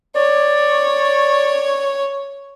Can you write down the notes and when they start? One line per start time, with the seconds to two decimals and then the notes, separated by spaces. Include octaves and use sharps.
0.16 C#5 D5